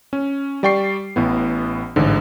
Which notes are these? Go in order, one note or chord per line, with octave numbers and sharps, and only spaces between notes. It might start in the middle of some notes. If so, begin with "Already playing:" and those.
C#4
G3 D5 G5 C#6 C7
A1 A2 B3
A1 G#2 D3